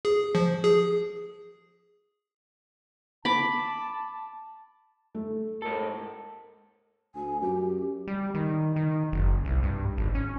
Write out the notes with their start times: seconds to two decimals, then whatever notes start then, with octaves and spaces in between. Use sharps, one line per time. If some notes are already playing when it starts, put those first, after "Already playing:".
0.05 G#4
0.35 F3
0.64 G#4
3.25 A5 B5 D6
5.15 A3
5.62 G#2 A4 A#4
7.15 D2 G#5
7.42 F#2 G4
8.07 G3
8.35 D#3
8.76 D#3
9.12 F#1
9.45 C2
9.63 G2
9.98 G#1
10.15 C#4